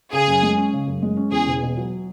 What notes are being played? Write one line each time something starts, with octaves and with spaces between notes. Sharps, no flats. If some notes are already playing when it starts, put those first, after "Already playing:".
C#3 G#4
F#2
G#3
C#4
C#3
F#2
G#3
C#4
E2 G#4
E1
B2
F#3